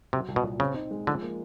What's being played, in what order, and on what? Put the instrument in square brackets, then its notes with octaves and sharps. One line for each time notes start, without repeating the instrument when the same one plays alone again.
[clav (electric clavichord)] C3 [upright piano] F#3
[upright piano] C2
[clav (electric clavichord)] B2
[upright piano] A#2
[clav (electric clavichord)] C#3 [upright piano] C4
[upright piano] D#4
G#3
[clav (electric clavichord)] D3 [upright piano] F3
[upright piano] A#3